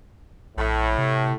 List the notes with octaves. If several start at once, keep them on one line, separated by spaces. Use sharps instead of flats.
A#1 A2
C3